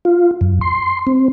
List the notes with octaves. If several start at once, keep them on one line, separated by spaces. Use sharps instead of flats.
F4
F#2
C6
C4